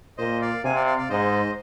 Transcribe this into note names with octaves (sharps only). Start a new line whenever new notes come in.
A#2 C5 D#5
D5 F5
C3 F5 G#5
D5 F5
D5 F5
D5 F5
G#2 C5 D#5